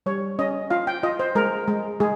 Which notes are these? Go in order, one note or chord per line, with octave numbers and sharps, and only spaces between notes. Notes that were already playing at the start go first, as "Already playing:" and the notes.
G3 C#5
C#4 D#5
F4 F5
G5
F4 D#5
C5
G#3 A#4
G#3
G#3 G#4